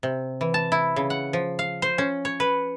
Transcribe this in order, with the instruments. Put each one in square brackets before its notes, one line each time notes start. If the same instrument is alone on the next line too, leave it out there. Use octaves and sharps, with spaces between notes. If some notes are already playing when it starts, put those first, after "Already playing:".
[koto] C3
E3
A5
E4
C#3
F#5
F3
F5
C5
C#4
C#5
B4